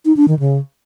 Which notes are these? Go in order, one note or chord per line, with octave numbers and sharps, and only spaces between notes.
D#4
D4
D#3
C#3